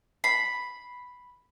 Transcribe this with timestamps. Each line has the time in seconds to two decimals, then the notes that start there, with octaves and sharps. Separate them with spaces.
0.24 B5 C7